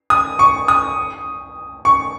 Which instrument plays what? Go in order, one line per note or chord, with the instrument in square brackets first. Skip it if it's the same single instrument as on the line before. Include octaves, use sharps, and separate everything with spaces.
[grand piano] D#6
C#6
D#6
C#6